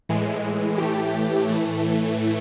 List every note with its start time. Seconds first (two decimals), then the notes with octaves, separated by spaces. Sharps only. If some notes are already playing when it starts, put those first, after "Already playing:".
0.09 A2 E3 G#3
0.78 A2 E3 A3 G4
1.48 A2 E3 A3